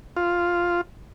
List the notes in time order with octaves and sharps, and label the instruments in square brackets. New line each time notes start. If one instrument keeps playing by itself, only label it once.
[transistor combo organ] F4